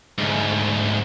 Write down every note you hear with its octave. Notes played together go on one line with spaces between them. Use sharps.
D2 G#2